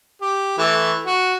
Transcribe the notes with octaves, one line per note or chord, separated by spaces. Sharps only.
G4
E3 A3
F#4